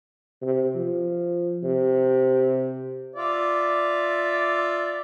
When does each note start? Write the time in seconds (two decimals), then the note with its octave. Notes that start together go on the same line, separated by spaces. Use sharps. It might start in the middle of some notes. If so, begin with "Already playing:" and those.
0.42 C3
0.75 F3
1.63 C3
3.16 F4 D5 E5